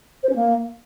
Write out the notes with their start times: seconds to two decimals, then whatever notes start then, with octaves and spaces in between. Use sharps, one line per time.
0.23 C5
0.29 C#4
0.35 A#3